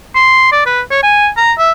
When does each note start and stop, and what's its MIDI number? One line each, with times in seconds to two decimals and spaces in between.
0.15 0.50 84
0.52 0.61 74
0.66 0.81 71
0.91 1.02 73
1.03 1.28 80
1.37 1.52 82
1.58 1.72 76